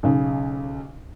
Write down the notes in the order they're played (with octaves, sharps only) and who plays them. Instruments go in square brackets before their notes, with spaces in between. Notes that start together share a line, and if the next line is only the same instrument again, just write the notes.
[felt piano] B1 C#3